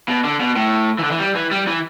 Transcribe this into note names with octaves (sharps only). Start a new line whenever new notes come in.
B2
D3
B2
A2
E3
D3
E3
G3
E3
G3
E3